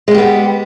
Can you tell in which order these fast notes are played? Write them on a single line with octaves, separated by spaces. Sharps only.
G#3 G3 G4 B3